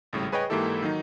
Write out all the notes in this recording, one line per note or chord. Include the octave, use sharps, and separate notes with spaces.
G#1 A2 C#3 G3
G#4 B4 C#5 D#5 G5 B5
G#2 E3 A#3 E4 G4 A4
D#3 F#3 D#4